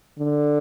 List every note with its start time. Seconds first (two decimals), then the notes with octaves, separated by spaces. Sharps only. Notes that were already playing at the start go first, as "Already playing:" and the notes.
0.19 D3